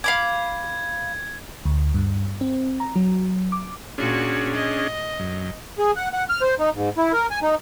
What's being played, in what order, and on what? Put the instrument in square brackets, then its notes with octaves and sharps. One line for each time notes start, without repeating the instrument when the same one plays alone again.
[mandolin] F5 B5 D6 [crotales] G#6
[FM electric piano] D2
G2
C4
A#5
F#3
D6
[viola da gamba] A#2 F#4 [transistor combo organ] C#4 D4 G#4
[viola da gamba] D#5
[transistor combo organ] F#2
[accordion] G#4
F#5
F#5
F6
C5
D#4
G#2
E4
A#4
G#5
D#4